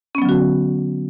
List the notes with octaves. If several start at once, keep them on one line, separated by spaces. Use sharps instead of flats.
D3 F#3 B3 C#4 F#4